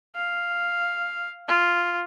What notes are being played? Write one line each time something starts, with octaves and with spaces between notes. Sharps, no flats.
F5
F4